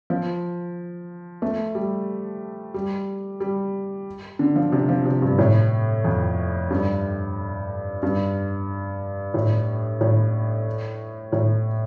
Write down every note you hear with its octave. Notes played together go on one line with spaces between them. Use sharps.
F3
A3
G3
G3
G3
D3
F3
C3
F3
C3
G2
A2
F2
G2
G2
A2
A2
A2